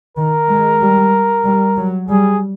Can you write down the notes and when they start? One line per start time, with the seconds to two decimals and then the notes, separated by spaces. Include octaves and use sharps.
0.17 D#3 A#4
0.49 G#3
0.81 G3
1.46 G3
1.77 F#3
2.08 G3 G#4